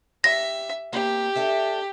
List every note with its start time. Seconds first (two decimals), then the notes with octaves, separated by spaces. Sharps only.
0.24 G4 E5 A#6
0.93 A#3 C4 G4
1.36 D4 A4 E5